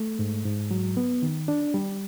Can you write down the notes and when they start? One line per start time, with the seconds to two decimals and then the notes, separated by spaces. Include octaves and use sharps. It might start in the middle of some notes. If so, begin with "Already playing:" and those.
Already playing: A3
0.19 G#2
0.45 G#2
0.71 F#3
0.97 B3
1.23 D#3
1.48 D4
1.74 G3